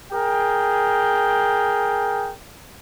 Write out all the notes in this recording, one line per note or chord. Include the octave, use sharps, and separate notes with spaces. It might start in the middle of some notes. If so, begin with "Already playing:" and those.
G#4 A#4 G5